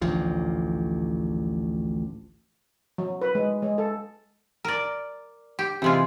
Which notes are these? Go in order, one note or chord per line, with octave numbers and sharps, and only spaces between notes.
A1 D2 F3
F#3
B4
G#3
G#3
A4
A#4 D5
G4
C3 E3 G#3 F4